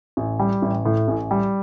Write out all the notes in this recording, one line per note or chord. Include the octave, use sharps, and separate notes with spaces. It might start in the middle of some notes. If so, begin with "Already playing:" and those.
A1
G3
A1
A2
A1
G3